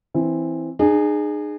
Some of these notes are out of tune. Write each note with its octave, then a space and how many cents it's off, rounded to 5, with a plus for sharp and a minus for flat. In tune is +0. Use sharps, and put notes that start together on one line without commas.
E3 +0 C4 +0
D#4 -45 G#4 +0